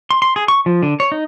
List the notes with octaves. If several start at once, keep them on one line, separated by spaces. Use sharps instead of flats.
C6
C6
G#4
C#6
F3
D3
C#5
D#4